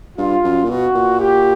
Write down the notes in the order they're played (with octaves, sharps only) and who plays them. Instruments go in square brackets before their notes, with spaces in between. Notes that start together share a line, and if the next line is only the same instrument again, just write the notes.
[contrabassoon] G2 [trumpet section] F4
[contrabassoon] F#2
A#2
[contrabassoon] B2 [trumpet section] F#4
[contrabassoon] A#2
[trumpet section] G4